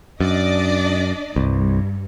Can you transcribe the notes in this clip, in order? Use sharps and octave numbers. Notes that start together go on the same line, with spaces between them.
F#2 D4 D5 D#5
C2 G2